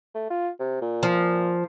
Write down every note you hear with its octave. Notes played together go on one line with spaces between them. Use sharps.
A3
F4
C3
A#2
F3